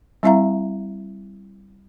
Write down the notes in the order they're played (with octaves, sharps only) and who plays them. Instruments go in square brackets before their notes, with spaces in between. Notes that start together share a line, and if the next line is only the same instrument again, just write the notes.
[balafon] G3 C4 E4 E5 F5 A#5